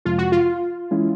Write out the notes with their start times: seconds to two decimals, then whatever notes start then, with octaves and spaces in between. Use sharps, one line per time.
0.05 F2 C3 F3 G#3 F4
0.18 F#4
0.32 F4
0.91 E3 G#3 C#4 E4